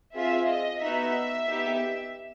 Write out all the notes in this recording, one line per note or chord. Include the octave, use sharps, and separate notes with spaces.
C4 F4 G#4 E5
D#5
B3 D#4 F#4 E5
B3 D#4 G4